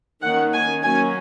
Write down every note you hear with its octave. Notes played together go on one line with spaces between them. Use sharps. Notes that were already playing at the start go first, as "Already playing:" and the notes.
D#3 A#3 C#4 F#5
G#5
F#3 A#3 C#4 G#5